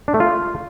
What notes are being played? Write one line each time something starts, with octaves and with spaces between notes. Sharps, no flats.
D4
A3
F4